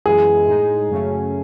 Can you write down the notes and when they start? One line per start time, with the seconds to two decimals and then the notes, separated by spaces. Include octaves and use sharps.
0.05 F#2 E3 G#3 B3 E4 G#4
0.47 A2 G#3 D#4
0.89 F#2 C#3 F#3 A3 C#4